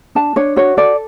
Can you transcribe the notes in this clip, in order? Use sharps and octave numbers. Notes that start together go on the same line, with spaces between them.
D4 A5
D4 C#5
F#4 C#5
A4 D5